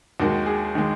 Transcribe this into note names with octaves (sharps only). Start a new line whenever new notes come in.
D#2 D#3 G#3 F#4
G#4
D#3 G#3